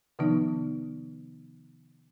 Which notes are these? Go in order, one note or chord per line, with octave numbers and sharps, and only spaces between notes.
C3 D#3 F3 B3 D#4